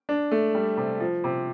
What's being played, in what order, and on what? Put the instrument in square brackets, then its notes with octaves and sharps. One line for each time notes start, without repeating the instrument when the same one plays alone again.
[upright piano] D4
A3
G3
C3
F3
C3